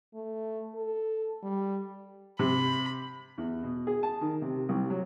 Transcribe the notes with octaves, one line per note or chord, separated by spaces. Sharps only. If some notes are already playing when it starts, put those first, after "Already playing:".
A3
A4
G3
C3 B5
E2
B2
G#4
A5
D#3
C3
C2
F#3